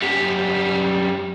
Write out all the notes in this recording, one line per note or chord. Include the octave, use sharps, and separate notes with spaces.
F#2 G3